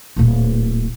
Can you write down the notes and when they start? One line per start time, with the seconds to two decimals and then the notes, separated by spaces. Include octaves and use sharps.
0.16 D1 A#2